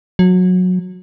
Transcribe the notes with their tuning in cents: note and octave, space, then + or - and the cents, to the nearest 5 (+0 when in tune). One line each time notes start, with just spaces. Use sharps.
F#3 -20